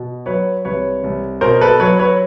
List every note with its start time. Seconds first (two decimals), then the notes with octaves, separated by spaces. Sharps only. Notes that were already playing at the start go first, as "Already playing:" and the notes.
Already playing: B2
0.26 F#3 B4 C#5
0.65 C2 B4 C#5
1.03 C2
1.41 B2 A#4 C5
1.61 A4 B4
1.80 F#3 B4 C#5
1.99 B4 C#5